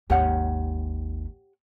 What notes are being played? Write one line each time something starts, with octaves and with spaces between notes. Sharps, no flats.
G#1 D#2 G4 C#5 F#5